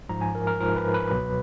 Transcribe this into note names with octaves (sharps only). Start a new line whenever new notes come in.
G#2 F3 A#5
G#5
A#4
A#4
G#2 F3 A#4
B4
B4
C#2 B2 F#3